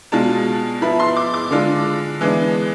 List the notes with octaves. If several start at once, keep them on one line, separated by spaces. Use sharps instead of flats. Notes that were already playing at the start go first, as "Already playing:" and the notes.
B2 G#3 D4 F4 A5
F3 B3 E4 B5
C6
D6
D6
D3 G#3 D4 F4
E3 G#3 B3 D4